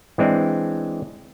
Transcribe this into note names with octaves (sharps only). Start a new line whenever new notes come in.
E3 G#3 C4 D4